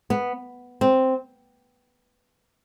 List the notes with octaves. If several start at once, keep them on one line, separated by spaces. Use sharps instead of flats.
B3
C4